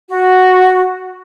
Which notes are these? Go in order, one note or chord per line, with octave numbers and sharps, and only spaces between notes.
F#4